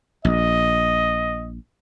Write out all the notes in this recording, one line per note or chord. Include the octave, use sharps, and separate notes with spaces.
A#1 D#5